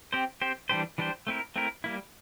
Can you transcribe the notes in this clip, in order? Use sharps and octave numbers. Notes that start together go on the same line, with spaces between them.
C4 G4 C5
C4 G4 C5
E3 G3 D4 G4 C5
E3 G3 D4 G4 C5
A3 C4 E4 A#4
A3 C4 E4 A#4
G3 A#3 E4